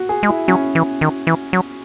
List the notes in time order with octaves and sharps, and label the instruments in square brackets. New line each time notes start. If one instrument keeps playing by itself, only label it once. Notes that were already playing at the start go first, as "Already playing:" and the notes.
Already playing: [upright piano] F#4
G#4
[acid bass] G#3
[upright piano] E4
[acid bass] F#3 [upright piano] C#4
[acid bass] E3
D#3
E3
F#3